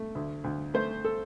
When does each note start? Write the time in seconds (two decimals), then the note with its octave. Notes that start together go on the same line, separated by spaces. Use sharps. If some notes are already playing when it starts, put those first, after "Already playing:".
Already playing: A3
0.15 D2
0.44 D2
0.74 A3 C5
1.05 A4